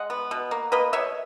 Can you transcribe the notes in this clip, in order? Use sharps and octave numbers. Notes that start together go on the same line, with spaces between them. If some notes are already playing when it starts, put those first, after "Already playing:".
Already playing: G#3 D#5 F#5
B3
B2
A#3
A#3 B4 D#5
B2 C#5 E5